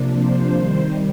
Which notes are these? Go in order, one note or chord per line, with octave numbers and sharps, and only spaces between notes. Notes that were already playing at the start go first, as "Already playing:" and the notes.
Already playing: C3 F3 A#3 D4
C5
C3 D#3 G3